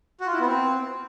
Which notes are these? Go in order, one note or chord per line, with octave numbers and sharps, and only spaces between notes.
F#4
F4
E4
B3
C4